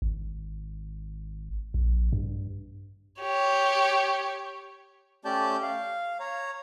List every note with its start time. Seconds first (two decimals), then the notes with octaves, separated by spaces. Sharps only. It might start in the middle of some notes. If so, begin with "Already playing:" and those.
0.02 G#1
1.74 A#1
2.13 G2
3.21 G4 C#5
5.25 A3 C#4 G4 D5 A5 G6
5.62 F5
6.20 C#5 A#5